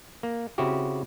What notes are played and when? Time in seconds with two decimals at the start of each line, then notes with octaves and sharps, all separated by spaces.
0.23 A#3
0.58 C#3 C4 E4 F#4 G4